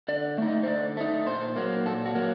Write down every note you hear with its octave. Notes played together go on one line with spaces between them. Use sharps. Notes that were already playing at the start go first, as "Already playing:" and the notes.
D3 D5
A3 D#4
D#5
C5
D3 D5
A3 D#4
A#2 C5
F#3 A#3
A#2 A4
F#4
F#3 A#3